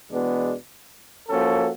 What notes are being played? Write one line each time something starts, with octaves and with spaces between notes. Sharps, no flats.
E2 B2 G#3 B3 D4
F3 A#3 C#4 F#4 A4